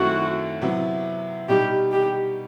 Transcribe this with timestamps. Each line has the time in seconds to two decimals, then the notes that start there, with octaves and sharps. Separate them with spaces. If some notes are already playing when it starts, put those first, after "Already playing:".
Already playing: F#2 D#3 A3 C4 E4 F#4
0.62 C3 F#3 B3 E4
1.48 B2 G3 D#4 G4
1.92 G4